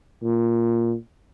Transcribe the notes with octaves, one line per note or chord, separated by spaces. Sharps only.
A#2